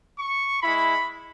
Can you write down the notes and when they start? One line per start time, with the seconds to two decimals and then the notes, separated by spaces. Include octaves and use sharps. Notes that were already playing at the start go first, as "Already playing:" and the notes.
0.19 C#6
0.62 G#3 E4 B5